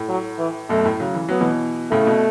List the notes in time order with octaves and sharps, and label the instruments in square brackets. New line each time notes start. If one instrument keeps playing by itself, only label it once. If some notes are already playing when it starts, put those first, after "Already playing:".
Already playing: [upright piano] A2
[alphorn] F#3
E3
[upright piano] F#2 B2 [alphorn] A3
[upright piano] A2
C#3 F#3
E3
[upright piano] F#3 [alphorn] B3
[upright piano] B2 E3
[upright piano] A2 C#3 [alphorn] A3
[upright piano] B2